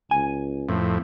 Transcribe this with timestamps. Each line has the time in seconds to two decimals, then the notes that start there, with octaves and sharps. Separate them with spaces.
0.11 C#2 G#5
0.69 F2 A2